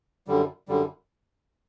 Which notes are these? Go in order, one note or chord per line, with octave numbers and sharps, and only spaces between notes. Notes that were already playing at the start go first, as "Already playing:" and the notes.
F#2 D3 G3
F#2 D3 G3